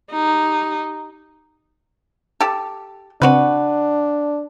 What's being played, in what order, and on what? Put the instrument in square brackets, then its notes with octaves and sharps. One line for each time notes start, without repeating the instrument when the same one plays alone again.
[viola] D#4 G4
[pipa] G4 A4
[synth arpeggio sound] C#3 C4 [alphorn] D4 [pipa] F#4 B4